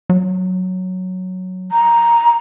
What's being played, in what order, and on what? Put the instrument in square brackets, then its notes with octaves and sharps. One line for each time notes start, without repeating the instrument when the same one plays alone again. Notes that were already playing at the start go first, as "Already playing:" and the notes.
[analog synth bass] F#3
[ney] A#5